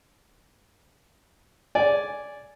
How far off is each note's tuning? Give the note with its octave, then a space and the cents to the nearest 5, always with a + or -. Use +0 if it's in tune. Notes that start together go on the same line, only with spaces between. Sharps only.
D5 -10 G#5 +0